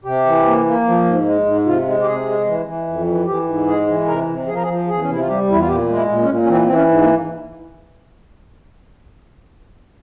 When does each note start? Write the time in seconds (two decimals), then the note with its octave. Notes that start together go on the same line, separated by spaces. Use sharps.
0.04 C3 G4
0.26 E3
0.45 A#3
0.65 A#3
0.86 F3
1.06 G#2
1.26 G#3
1.45 G#2
1.66 C3 F4
1.86 G#3
2.01 G4
2.06 C3 G#4
2.26 G#3
2.47 E3
2.66 E3
2.87 F2
3.07 E3
3.26 E3 G4
3.47 G#2
3.67 G#3 G#4
3.87 E3
4.07 C3 A#4
4.28 C3
4.47 F3 G#4
4.55 A#4
4.62 G#4
4.68 F3
4.87 E2 G#4
5.01 C#4
5.08 C3 E4
5.19 F4
5.27 G3 G4
5.48 E2 E4
5.60 F4
5.68 A#2 G4
5.89 G#3
5.94 E4
6.08 A#2
6.22 C#4
6.29 A#2
6.43 C#4
6.48 E3 C4
6.65 E3 C4
6.75 C#4
6.89 G#2
7.02 A#3